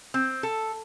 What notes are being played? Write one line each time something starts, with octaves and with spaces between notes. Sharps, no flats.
C4
A4